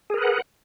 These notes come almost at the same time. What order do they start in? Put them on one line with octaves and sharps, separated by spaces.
G#4 A#4 B4 F#5